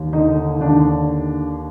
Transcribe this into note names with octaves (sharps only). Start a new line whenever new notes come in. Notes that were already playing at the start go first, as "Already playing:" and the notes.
Already playing: D#2
D3 D#4
D#2 D4